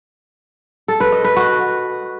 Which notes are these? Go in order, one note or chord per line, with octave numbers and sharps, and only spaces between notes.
A4
B4
D#5
B4
F#4